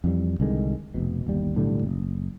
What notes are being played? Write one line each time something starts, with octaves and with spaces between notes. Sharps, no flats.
F2 E3 G3
C2 D3 D#3 G#3
F1 B2
G1 D#2 G3
B1 A2 D3 G3
F#1